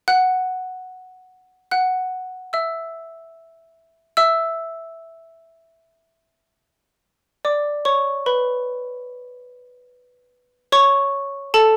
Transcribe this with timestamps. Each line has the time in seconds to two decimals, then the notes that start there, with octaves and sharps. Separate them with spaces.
0.08 F#5 F#6
1.71 F#5 F#6
2.53 E5 E6
4.17 E5 E6
7.45 D5 D6
7.85 C#5 C#6
8.26 B4 B5
10.72 C#5 C#6
11.54 A4 A5